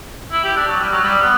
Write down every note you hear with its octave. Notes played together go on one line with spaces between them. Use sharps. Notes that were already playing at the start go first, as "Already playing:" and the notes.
E4
G4
D4
F#3
G3
F#3
G3
B3